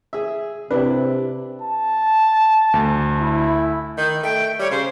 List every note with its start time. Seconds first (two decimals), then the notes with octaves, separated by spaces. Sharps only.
0.13 G#4 E5
0.71 C3 D4 E4 B4
1.62 A5
2.74 D2
3.20 E4
3.98 D#3 G6
4.23 A3 G5
4.59 G3 C#5
4.71 C#3 C5